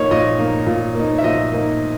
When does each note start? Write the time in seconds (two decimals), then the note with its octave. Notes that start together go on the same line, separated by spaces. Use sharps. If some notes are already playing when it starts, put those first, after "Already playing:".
Already playing: A#2 A#3 D#4 C#5
0.11 A#2 D#5
0.39 A#3 D#4
0.67 A#2
0.95 A#3 D#4
1.18 E5
1.24 A#2 D#5
1.52 A#3 D#4